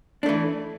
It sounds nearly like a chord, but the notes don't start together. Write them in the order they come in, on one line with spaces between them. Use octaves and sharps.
D4 A3 E3